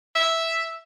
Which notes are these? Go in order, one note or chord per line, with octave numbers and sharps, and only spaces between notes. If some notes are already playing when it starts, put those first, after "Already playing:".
E5